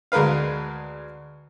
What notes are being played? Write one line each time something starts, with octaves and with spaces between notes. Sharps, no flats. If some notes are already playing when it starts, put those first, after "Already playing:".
D2 G#3 A#4 B4 F5